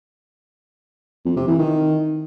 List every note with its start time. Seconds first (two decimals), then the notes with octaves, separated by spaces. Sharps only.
1.25 F2
1.37 C3
1.48 E3
1.59 D#3